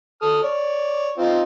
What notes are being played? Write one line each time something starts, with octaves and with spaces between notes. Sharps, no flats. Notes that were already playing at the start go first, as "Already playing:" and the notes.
A4 D#6 F6
C#5 D5
C4 D#4 F4